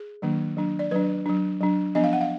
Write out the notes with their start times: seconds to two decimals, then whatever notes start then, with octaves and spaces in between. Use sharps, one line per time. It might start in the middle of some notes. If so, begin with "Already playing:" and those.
Already playing: G#4
0.22 D#3 F#3 A#3 D4
0.57 F#3 D4
0.79 D5
0.91 F#3 D4 B4
1.26 F#3 D4
1.61 F#3 D4
1.95 F3 B3 D4 D#5
2.04 F5
2.13 F#5
2.21 F5